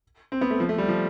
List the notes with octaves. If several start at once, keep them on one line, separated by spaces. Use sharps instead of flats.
C4
B3
A3
F3
A3
G3
F3